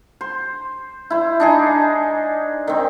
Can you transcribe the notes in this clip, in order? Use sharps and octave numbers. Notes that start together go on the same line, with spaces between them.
C5
E4 C5
D4 D#4 G#4
D#3 C4